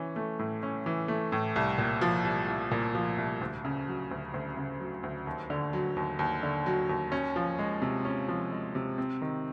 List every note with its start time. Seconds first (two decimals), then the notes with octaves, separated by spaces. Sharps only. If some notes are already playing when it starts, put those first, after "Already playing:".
Already playing: E3 C#4
0.16 A3
0.39 A2
0.63 C#4
0.86 E3
1.08 A3
1.32 A2
1.56 C2
1.78 A#2
2.01 F3
2.25 C2
2.48 C2
2.71 A#2
2.95 F3
3.18 C2
3.41 D2
3.65 C#3
3.88 F#3
4.11 D2
4.34 D2
4.57 C#3
4.80 F#3
5.03 D2
5.27 D#2
5.50 D3
5.73 F#3
5.96 D#2
6.19 D#2
6.43 D3
6.66 F#3
6.89 D#2
7.12 C#4
7.36 F3
7.59 G#3
7.82 C3
8.05 C#4
8.29 F3
8.52 G#3
8.75 C3
8.98 C4
9.22 D#3